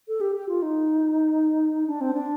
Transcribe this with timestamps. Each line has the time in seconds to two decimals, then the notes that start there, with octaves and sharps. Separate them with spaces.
0.08 A4
0.21 G4
0.36 G4
0.49 F4
0.62 D#4
1.87 D4
2.01 C4
2.14 D4